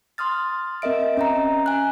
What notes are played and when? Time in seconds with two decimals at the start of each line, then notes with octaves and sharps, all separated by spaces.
0.18 C6 D#6 F6 A6
0.82 C4 A#4 D#5 E5 D7
1.17 C#4 D#5 A#5
1.66 G#5 F#6